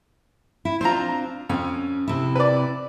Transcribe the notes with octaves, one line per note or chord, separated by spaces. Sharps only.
E4
C4 D4 F4 C5 A#5
F2 C#4
C3 E4
B4 D5